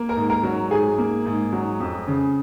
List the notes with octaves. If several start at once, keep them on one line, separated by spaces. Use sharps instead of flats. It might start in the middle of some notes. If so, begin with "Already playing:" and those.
Already playing: A#3
A#4 A#5
G#2
A#4 A#5
F#3
G#2 G#4 G#5
A#3
G#2
F#3
F2
C#3